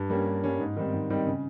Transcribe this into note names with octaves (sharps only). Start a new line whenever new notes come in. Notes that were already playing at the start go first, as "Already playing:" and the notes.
Already playing: G2
G3 A#3 C#4
G2
G3 A#3 C#4
G#2
D#3 G3 C4
G#2
D#3 G3 C4
C#3